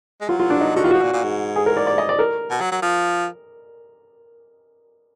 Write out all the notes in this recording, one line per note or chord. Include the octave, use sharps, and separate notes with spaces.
G#3
F#3 F4
F4
D4
D#4
D3 F#4
D#3 F4
F3 F#4
A#2
A#2
G#2
G#4
A#4
D5
D5
D#5
D5
A#4
B2
F#3
F#3
F3